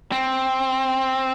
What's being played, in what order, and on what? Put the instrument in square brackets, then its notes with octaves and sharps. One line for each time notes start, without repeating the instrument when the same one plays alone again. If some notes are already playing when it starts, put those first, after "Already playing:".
[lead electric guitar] C4